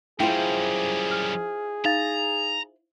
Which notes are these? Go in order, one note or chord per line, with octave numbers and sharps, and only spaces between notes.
F#2 G3 E4 F4 G#4 C5 G5
F6
D#4 F5 A#5 A6